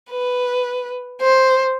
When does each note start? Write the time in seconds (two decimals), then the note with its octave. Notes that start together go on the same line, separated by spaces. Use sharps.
0.11 B4
1.22 C5